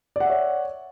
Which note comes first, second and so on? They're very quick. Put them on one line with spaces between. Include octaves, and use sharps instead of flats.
D5 F#5 E5 C#5